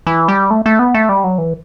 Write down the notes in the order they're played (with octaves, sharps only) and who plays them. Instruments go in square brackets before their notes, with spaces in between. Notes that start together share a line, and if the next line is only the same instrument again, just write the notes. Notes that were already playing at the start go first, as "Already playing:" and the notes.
[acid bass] E3
G3
A3
A3
B3
A3
G3
F#3
E3